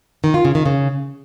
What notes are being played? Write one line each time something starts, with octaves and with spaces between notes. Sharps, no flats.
D#3
F4
C#3
D#3
C#3